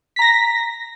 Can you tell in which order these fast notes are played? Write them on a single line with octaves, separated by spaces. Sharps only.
B6 A#5 A#6